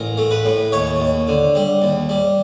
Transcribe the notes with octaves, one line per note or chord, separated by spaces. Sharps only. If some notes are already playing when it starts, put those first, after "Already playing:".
Already playing: A1 A#4
A3
B4
A2
D#2 C#5
D#2
D3
G3
D#2
G3